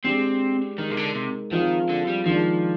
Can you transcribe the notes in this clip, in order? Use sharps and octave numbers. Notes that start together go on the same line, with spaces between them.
G#3 C4 D4 G4
D#3 G#3 D#4 A#4
C3
D3
C3
D#3 F3 C4 F4 G#4
D3
G3
D#3 F3 G#3 D4